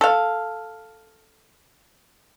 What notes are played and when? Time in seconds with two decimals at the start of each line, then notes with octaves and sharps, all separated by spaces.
0.01 A4 F5